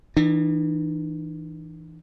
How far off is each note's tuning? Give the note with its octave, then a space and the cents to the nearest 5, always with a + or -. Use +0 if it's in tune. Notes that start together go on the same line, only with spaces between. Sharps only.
E3 -15 D4 +45